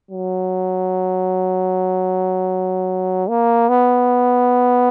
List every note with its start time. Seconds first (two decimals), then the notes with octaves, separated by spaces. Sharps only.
0.11 F#3
3.29 A#3
3.69 B3